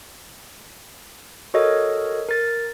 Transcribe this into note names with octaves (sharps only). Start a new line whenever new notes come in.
F#4 A4 A#4 C#5 D#5
A#4 A6